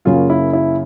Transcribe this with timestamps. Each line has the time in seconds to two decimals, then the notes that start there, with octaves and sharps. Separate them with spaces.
0.05 F#2 C#3 F#3 A#3 C#4 F4
0.30 E4
0.53 E4